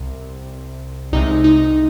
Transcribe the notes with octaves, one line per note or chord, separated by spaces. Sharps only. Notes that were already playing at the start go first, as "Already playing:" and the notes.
Already playing: C2 C3
C2 C3 G#3 D#4
D#4